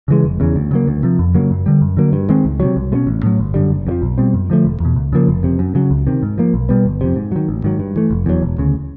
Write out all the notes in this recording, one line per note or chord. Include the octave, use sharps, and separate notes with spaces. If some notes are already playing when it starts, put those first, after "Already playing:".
C#3 E3 G#3
F1
E2 C#3 E3
D2
C#3 F#3 A#3
D2
C3 F3
F2
C#3 F#3 A#3
F#2
D3 G3
F#2
D3 F#3 A#3
G2
D#3 G#3 C4
C#2
C3 D#3 F#3
C2
B2 G#3 C#4
A1
A2 F#3
G1
F#2 D3 G3
F#1
F2 C#3 F3
B1
B2 G3 C4
F#2
D3 F3 A3
E1
E2 B2
C#2
C#3 F3 A#3
F1
F2 C3
F#2
C#3 F#3
C#2
C3 D#3
G#2
F3 A#3
B1
B2 G3 B3
G1
F2 C3
G#2
D#3 F#3
A1
G#2 D#3 F#3
G2
E3 A3
F1
E2 B2 F#3
E1
D2 C#3